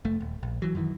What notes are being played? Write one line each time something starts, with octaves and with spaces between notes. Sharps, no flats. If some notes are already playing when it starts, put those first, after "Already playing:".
F1 A3
D#1
A#1
E3 F#3
F#2 D#3 E3